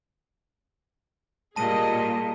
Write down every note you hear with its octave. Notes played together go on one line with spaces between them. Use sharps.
A#2 G3 G#4 D#5 A5 D#7